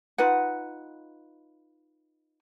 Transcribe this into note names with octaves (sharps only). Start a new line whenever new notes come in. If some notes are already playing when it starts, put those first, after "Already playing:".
D#4 F4 B4 F#5